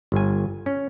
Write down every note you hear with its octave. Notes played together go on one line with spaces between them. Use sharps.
G1 G#5
C#4